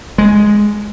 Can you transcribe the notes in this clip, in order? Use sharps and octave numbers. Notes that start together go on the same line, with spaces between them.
G#3